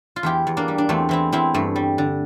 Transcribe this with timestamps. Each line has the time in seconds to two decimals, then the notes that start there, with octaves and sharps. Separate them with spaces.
0.16 F4
0.23 E2 E4 G4
0.47 E2
0.57 A#3 D4
0.68 G3
0.78 D4
0.89 E2 A3 C4
1.09 E3 C4 E4
1.32 E2 C4 E4
1.54 G2 A3
1.76 G3
1.98 D3